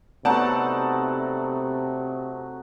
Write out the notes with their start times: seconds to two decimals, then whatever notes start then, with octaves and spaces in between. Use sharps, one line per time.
0.25 C3 F#3 A3 B3 D#4 D5 F#5 A5